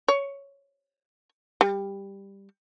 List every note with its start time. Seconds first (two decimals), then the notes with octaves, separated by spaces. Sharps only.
0.08 C#5
1.61 G3